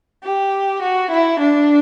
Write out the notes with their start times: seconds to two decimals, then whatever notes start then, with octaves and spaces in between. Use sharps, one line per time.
0.24 G4
0.82 F#4
1.11 E4
1.40 D4